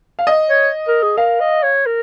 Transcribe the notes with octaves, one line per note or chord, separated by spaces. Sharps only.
F5
D#5
C#5
A#4
G#4
A#4 F5
D#5
C#5
A#4